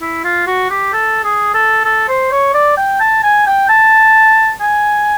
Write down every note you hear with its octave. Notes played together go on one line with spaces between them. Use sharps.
E4
F4
F#4
G4
A4
G#4
A4
A4
C5
C#5
D5
G5
A5
G#5
G5
A5
G#5